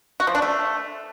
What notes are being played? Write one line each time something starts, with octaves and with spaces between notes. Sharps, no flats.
F#4
F3
D4
A3